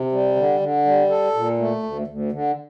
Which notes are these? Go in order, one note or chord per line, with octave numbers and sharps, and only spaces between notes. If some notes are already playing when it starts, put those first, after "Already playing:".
Already playing: C3
G3
D3
D3
G3
A4
A#2
A3
D2
D2
D3